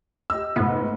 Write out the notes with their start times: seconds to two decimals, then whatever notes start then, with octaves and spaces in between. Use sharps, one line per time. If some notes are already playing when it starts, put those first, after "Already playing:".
0.30 G4 D#5 E6
0.56 F1 G#2 B3